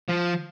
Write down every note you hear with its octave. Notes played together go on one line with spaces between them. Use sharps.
F3